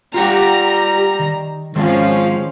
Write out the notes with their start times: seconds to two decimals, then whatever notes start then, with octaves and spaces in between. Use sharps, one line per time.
0.14 G3 F4 G4 F#5 A#5
1.19 D#3
1.76 D#3 F3 G#3 C#4 F5